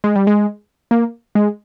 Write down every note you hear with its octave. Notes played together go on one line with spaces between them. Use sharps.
G#3
G3
G#3
A#3
G#3